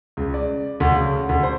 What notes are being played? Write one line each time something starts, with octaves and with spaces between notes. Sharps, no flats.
C#2
D5
D2
C#3
D2
C5